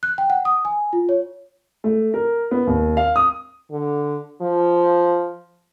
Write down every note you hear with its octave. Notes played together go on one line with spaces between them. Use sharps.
F#6
G5
F#5
D#6
G#5
F4
C#5
A3
A#4
B3
D#2
F5
D#6
D3
F3